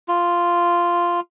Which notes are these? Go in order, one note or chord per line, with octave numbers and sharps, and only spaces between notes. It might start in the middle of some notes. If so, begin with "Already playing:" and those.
F4